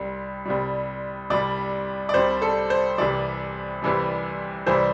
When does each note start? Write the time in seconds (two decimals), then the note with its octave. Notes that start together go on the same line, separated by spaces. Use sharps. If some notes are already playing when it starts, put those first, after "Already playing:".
Already playing: C2 C3 G3
0.46 C2 C3 G3
1.30 C2 C3 G3 D5
2.09 D5
2.14 C2 C3 G3 C5
2.42 A4
2.70 C5
2.98 C2 C3 E3 G3 D5
3.82 C2 C3 E3 G3
4.66 C2 C3 E3 G3 C5